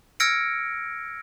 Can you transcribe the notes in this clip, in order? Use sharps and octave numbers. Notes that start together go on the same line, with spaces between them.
E6 F6 G#6 A#6 C#7 D7